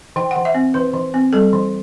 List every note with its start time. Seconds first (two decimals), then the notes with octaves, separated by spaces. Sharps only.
0.16 E3 G5
0.31 E3 F#5
0.45 E5
0.55 C4
0.74 E3 B4
0.94 E3
1.14 C4
1.33 G3 A4
1.53 E3